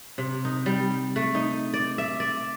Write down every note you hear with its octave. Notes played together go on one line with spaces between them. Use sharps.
C3
D#4
G3
A3
D#4
D5
E5
D5